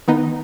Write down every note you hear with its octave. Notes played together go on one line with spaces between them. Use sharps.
D#3 B3 D#4